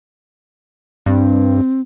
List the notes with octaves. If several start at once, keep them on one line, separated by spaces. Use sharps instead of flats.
G2 C4